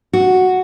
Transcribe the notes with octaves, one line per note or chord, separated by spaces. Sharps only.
F#4